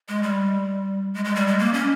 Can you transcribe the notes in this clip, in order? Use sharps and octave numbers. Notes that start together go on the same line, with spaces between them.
G#3
G3
G#3
G#3
G3
G#3
A#3
C#4